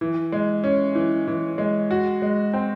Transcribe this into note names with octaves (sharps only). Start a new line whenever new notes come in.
E3
G#3
C#4
E3
E3
G#3
F#4
G#3
C4